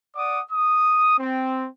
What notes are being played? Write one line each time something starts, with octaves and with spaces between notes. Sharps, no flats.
D5 F#5 D6 D#6
D#6
C4